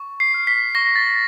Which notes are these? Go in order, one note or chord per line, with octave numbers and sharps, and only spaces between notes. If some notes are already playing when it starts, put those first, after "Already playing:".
Already playing: C#6
C7
F6
B6
C#6 A#6
A6